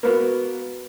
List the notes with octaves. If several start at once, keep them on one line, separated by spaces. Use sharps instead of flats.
A#3 B3 F#4